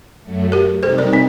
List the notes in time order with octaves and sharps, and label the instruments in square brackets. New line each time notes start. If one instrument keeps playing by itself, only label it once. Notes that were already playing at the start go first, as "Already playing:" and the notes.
[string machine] F#2 F#3 A3
[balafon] G4 A#4
[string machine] C3 G3 C4 D#4 G4 [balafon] A4 C5
[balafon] A#4 D5
C4 D#4